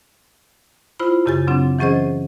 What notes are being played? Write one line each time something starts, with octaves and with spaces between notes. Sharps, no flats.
E4 F4 C5 B5
F#2 C#3 G4 G#5 A6
C#3 F#3 C4 D4
E3 F#3 C#4 G#4 C5 D#5